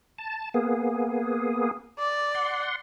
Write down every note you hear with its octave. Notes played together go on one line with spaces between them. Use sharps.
A5
A#3 B3 G#4
D5
F#5 C6